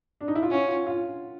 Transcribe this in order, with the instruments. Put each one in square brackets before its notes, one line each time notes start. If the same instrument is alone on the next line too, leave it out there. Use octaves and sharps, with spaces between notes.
[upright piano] D4
D#4
E4
F4
[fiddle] C#4 [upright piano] F#4
[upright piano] F4
F4